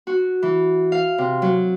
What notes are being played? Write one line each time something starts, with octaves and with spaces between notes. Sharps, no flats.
F#4
E3
F5
C3
F#3